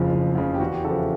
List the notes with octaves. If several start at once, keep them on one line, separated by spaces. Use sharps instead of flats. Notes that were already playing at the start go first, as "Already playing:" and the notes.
Already playing: F#1 F2 C#3 F3
F#1
F2 C#3 F3
G4
E2 F#4
G4
C#3 F3 A4
E4